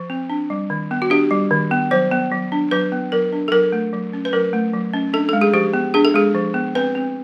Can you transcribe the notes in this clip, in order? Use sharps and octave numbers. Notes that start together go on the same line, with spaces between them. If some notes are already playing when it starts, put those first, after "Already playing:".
Already playing: F3
C4
D4
G3
D#3
B3
F#4
D4 G4
G3
D#3
B3
F#3 C5
B3
F#3
D4
F#3 B4
B3
F#3 A#4
D4
A4
F#3 A#4
A3
F#3
C#4
B4
F#3 A#4
A3
F#3
C#4
D4 A4
G#3 A4
G#4
F3 G4
B3
D4 G#4
A4
G#3 G#4
F3
B3
C4 B4
C4